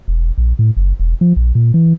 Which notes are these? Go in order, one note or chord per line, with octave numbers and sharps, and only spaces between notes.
E1
A#1
A2
F#1
E1
F3
A#1
A#2
E3